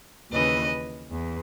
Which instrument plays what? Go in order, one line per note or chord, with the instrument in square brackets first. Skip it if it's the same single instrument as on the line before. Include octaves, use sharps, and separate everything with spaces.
[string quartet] D#2 C#3 E3 B4 D#5
E2